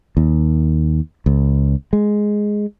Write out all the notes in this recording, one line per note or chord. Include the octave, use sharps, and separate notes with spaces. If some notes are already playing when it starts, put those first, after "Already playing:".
D#2
C#2
G#3